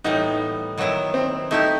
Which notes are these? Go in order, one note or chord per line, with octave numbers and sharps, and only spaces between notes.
A2 E3 G3 B3 D#4
D#3 F#3 B3 E4
C4
A3 D#4 E4 G4